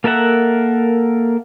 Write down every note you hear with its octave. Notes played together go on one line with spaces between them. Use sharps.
A#3 A4 A#4 E5 F#5